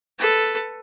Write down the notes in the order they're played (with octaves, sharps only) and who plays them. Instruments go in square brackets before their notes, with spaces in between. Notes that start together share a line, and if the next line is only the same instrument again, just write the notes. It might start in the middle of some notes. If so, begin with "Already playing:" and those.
[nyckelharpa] A4 B4